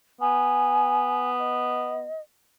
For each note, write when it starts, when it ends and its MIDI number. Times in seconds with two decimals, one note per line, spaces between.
0.21 2.08 59
0.21 1.29 80
1.39 2.22 75